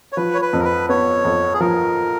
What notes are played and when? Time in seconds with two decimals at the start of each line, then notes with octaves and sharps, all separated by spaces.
0.13 C#5
0.17 F3 B4
0.34 C#5
0.42 B4
0.53 F2
0.59 A#4
0.65 B4
0.89 B3 C#5
1.25 F2
1.54 G#4
1.60 F3 A#4